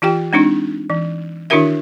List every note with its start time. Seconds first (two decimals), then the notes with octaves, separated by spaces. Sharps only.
0.02 E3 F4 G4 G5
0.33 G#3 C4 D4 D#4
0.90 E3
1.50 D#3 D4 E4 F#4 A#4 E5